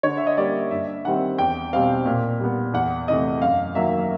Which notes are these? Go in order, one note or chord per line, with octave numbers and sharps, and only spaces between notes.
D3 C#5
E5
D#5
G3 A#3 C#4 D5
G2 E5
D#3 G3 C4 F#5
E2 G5
B2 G3 C4 F5
A#2
G3 B3
E2 F#5
C3 E3 A3 D#5
F#2 F5
D#3 F#3 A#3 E5